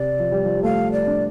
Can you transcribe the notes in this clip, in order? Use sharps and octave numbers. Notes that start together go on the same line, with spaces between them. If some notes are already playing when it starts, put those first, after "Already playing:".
Already playing: C3 D5
F3
G3
F3
G3
A3 F5
D5
D4